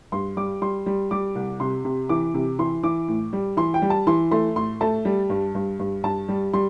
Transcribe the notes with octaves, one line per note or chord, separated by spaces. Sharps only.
G2 C6
G3 D6
G3 C6
G3
G3 D6
C2
C3 C6
C3
E3 D6
C3
E3 C6
E3 D6
A2
G3
E3 C6
G5
G3
A5
E3 C6
A3 C6
A2 C6
A3 A5
G3
G2
G2
G2
G2 A5
G3
G3 C6